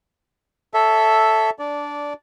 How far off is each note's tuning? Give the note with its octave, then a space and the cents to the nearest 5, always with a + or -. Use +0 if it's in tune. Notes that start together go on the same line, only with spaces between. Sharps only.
A4 +0 C#5 +25 E5 +0
D4 -10 D5 -15